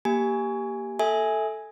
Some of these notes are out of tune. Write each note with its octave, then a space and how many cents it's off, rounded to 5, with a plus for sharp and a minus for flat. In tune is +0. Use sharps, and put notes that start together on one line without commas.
A#3 +10 G4 +0 G#5 +0
A4 +0 E5 -15 G#5 +0